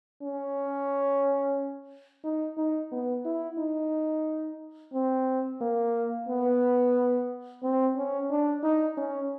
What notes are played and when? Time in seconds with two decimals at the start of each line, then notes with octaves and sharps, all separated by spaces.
0.22 C#4
2.24 D#4
2.58 D#4
2.92 B3
3.25 E4
3.58 D#4
4.93 C4
5.61 A#3
6.28 B3
7.63 C4
7.96 C#4
8.30 D4
8.64 D#4
8.97 C#4